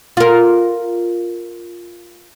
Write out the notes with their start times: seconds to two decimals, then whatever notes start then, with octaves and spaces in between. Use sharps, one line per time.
0.17 F4 A#4